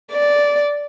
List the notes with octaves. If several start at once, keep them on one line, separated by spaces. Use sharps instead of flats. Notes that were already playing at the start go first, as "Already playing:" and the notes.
D5